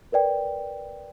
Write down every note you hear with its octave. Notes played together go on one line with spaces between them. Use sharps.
A#4 B4 D5 G5